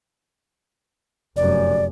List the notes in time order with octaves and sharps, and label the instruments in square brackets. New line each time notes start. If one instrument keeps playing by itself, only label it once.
[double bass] F1 F#2 [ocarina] D5